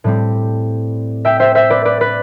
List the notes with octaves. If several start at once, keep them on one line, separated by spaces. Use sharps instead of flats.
A2 G3 C4
E5 G5
C5 E5
C5 E5
B4 D5
B4 D5
B4